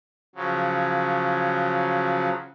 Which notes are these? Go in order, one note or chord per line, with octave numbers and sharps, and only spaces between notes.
C#3 F3 F#3